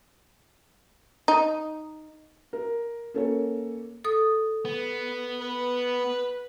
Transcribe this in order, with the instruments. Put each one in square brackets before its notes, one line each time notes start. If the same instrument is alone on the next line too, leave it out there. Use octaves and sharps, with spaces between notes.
[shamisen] D#4
[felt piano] A#4
A#3 C#4 A4 A#4 C#5
[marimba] A4 D#6
[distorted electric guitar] B3
[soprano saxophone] B4